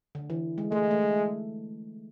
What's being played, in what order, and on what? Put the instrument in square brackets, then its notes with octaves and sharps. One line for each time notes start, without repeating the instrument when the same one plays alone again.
[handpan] D3
E3
G#3
[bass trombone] G#3 [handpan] A3
[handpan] A3